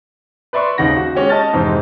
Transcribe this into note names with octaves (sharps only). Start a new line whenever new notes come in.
B4 D5 E5 C6 C#6
G#1 D#2 C#3 D#4 F#5 A#6
F#4
G#3 C#4 G4
D#5 A5 F6 A6
F2 G#2 C3 E3 D#4